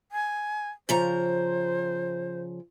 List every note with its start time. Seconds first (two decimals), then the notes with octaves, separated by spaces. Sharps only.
0.12 G#5
0.89 C#3 F3 C5 A#5